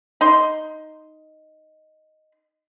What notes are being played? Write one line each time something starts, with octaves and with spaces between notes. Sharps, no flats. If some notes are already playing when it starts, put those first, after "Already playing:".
D#4 C6